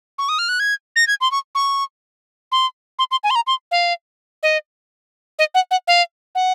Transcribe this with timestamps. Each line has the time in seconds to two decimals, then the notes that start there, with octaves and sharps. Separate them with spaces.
0.18 C#6
0.29 D#6
0.39 F6
0.49 F#6
0.60 G#6
0.96 A#6
1.07 G#6
1.21 C6
1.31 C#6
1.55 C#6
2.52 C6
2.99 C6
3.11 C6
3.24 G#5
3.30 C6
3.35 A#5
3.47 C6
3.71 F5
4.43 D#5
5.39 D#5
5.54 F#5
5.71 F#5
5.88 F5
6.35 F#5